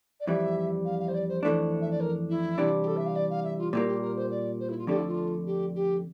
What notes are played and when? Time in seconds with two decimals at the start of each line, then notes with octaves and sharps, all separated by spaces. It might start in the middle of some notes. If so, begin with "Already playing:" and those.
0.20 D5
0.27 F2 E3 G3 E5
0.85 F5
1.00 F5
1.08 C5
1.14 D5
1.29 C5
1.43 F2 E3 A3 D4
1.81 E5
1.91 D5
2.01 A#4
2.29 E4
2.58 C3 E3 G3 D4
2.82 G4
2.87 A4
2.97 E5
3.06 F5
3.16 D5
3.30 F5
3.44 E5
3.59 F4
3.73 A#2 G3 A#3 E4
3.88 G4
4.02 A#4
4.16 C5
4.31 D5
4.60 C5
4.69 E4
4.79 F4
4.87 F2 D3 A3 D4 G4
4.98 E4
5.07 F4
5.46 G4
5.75 G4